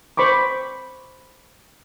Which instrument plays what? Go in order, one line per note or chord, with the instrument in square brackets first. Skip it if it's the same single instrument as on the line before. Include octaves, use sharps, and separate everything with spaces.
[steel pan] C5 B5 C#6 D6